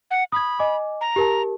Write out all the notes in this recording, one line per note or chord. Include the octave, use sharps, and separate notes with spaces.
F#5
B5 D#6 G#6
D#5 G#5 D6
A#5
G4 A#4 A5